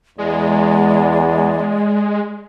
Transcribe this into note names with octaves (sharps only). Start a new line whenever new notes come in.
E2 G#3 D5